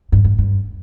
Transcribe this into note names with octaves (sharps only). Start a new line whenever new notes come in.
G2
G#2
G2